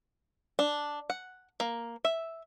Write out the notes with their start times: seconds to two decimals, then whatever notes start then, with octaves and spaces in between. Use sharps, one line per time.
0.59 D4
1.10 F#5
1.60 A#3
2.05 E5